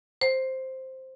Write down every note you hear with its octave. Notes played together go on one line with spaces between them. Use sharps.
C5